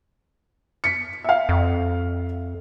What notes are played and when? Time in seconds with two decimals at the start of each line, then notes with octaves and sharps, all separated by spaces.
0.84 B6 C#7
1.24 E5 F5
1.49 F2